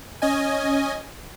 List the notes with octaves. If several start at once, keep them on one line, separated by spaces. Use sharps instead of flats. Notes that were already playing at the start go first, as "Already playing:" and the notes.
C#4 D#5 G#5